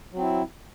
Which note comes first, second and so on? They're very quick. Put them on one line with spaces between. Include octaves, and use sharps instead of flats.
F#3 C4 E4